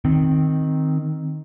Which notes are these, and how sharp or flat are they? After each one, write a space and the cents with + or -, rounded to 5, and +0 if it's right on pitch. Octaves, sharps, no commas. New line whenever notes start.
D#3 +0 C4 +0